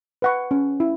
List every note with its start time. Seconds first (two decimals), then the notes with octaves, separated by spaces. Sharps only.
0.22 B4 F#5 C#6
0.51 C#4
0.80 E4